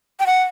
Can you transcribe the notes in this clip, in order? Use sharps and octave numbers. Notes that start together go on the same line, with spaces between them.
G5
F#5